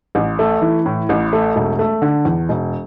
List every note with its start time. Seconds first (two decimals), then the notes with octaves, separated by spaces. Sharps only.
0.15 A1
0.39 A3
0.62 E3
0.86 A2
1.09 A1
1.33 A3
1.56 E1
1.79 A3
2.02 D3
2.25 E2
2.49 E1